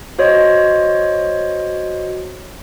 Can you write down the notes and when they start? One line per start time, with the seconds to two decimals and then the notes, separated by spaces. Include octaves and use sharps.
0.19 F#4 C5 C#5 D#5